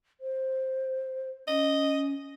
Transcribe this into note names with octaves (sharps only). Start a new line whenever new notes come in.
C5
C#4 D#5